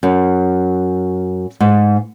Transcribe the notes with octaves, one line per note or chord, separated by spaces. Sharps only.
F#2
G#2